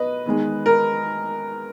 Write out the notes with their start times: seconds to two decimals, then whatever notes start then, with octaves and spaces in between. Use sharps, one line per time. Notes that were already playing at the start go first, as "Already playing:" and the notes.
Already playing: B2 B4 D#5
0.26 E2 D#3 G#3
0.66 A#4